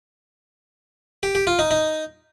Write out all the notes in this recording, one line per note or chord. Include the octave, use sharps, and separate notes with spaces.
G4
G4
F4
D#4
D#4